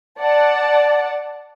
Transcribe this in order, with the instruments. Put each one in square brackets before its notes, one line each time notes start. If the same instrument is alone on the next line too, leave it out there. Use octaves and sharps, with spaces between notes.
[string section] D5 F#5 A5